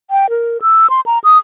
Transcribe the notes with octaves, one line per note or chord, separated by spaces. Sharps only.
G5
A#4
E6
C6
A#5
D#6